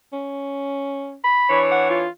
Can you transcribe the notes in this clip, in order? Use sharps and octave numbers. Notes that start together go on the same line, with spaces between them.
C#4
B5
E3 D4 C#5
F#5
F4